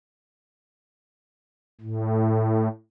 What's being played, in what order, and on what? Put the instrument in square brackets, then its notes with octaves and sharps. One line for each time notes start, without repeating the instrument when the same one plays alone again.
[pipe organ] A2